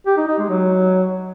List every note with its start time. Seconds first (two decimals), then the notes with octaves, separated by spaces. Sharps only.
0.07 G4
0.17 D#4
0.28 D#4
0.39 G#3
0.49 F#3